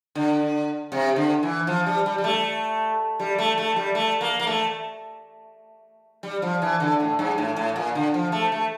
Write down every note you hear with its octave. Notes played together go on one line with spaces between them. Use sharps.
D3
C3
D3
E3
F3
G3
G3
G3
A3
G3
A3
A3
G3
A3
A#3
A#3
A3
G3
F3
E3
D3
A2
G2
A2
A2
A#2
D3
F3
A3
A3